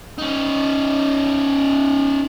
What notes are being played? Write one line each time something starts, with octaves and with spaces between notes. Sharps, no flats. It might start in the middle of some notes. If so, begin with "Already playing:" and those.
C#4 D#4